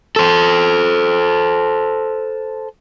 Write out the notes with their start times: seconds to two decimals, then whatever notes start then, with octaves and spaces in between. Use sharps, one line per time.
0.16 A4 C5